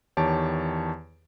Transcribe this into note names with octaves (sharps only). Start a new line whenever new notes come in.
E2 D#3 G4 C#5 A5 D7